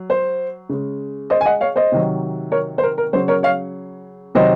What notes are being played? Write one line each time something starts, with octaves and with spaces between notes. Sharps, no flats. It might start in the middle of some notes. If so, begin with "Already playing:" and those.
Already playing: F#3
C5
C#3 G#3
C5 D#5
G#5
D#5 F#5
C#5 F5
C5 D#5
C3 D#3 F#3
A#4 C#5
C5
A#4
A#4
C#3 F#3 C5
A#4 C#5
C#5 F5
C3 D#3 F#3 C5 D#5